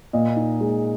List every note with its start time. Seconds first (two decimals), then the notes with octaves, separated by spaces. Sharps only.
0.13 A#2 D#5
0.36 D#4
0.61 G#3